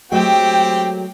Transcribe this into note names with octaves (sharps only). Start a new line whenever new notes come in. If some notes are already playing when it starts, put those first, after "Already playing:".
F#3 G#3 A3 C4 G4 G5